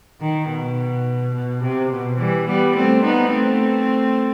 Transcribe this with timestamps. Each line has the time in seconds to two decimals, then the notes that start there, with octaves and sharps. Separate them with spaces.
0.21 D#3
0.50 B2
1.34 B2
1.63 C3
1.91 B2
2.19 E3 G3
2.48 G3 B3
2.76 A3 C4
3.04 B3 D#4
3.33 A3 C4